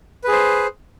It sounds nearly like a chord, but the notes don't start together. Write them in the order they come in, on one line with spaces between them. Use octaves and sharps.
B4 G#4 C5